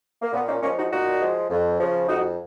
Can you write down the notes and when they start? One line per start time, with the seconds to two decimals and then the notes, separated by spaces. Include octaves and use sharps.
0.22 A#3
0.33 A#2 B3
0.44 D#4
0.49 A#3 C#4
0.62 F3 G#3 A#3 C#4
0.78 D#4 F#4
0.91 A#2 D#4 F#4
1.21 F3 G#3
1.50 F2
1.79 C#3 F3
2.09 F2 D#4 F#4